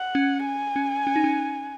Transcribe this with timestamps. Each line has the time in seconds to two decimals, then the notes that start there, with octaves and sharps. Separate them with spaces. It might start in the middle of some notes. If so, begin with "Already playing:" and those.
Already playing: F#5
0.15 C#4
0.46 G#5
0.76 C#4
1.07 C#4
1.16 D#4
1.24 C#4